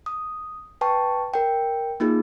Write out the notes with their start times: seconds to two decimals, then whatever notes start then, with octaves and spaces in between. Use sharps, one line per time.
0.06 D#6
0.81 B4 G5 A5 C#6
1.34 A#4 G5
2.00 A#3 D#4 F4 G#4